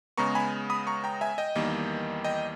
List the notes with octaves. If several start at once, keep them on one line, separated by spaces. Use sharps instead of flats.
C#3 G#3 B3 A#5 C#6
G#5 B5
B5 D#6
A#5 C#6
G5 A#5
E5 G#5
D#5 G5
E2 D#3 G3 A#3
D#5 G5